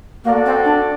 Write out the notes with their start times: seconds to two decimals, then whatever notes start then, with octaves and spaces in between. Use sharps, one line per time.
0.24 A#3 F#4 A4 D5 F#5
0.46 C4
0.65 D4